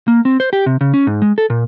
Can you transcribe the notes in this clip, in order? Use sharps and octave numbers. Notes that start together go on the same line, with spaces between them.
A#3
C4
C5
G4
C3
C#3
C#4
G#2
G#3
A4
A#2